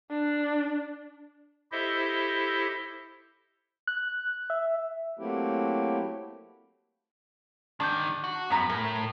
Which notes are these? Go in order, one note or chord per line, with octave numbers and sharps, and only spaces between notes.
D4
E4 G4 A4 C5 D#5 E5
F#6
E5
F#3 A3 A#3 C4 E4 G4
D#3 G#3 D4 D6 G6
F#4
F#2 B3 A#5 B5
A2 A#4